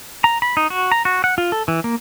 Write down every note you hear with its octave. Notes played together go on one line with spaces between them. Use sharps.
A#5
B5
D#4
F#4
A#5
F#4
F#5
F4
A4
E3
A#3